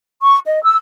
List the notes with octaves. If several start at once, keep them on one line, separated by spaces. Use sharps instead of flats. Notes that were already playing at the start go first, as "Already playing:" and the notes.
C#6
D#5
E6